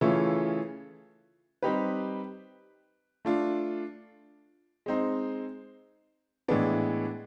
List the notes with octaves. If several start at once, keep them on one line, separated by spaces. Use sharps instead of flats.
C#3 E3 A3 C#4 F4
G3 C4 D#4 G4 B4
A3 D4 F4
G#3 C4 D#4
A2 E3 G#3 B3 D4